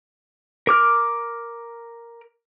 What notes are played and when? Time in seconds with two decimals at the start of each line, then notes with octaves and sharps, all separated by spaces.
0.67 A#4 D6 F6